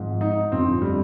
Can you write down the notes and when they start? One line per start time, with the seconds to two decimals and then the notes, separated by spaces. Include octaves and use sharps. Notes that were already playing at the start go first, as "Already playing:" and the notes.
Already playing: G#1 G#2 F3
0.21 D#4
0.52 G1 F2 C#3 F3 C4
0.82 G3